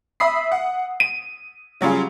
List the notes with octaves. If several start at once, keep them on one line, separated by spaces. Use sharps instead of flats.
E5 B5 D#6 C7
F#5
D#7
C#3 F#3 G3 F4 G#4